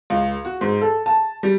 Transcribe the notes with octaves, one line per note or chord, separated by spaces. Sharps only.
C#2
F#4
G#2
A4
A5
G3